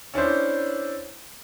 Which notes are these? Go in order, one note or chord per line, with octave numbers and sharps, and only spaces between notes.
C#4 D4 E4 C5